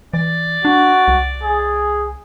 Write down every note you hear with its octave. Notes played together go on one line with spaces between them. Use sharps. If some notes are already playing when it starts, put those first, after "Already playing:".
E3 D5
D4 F#4
C2
G#4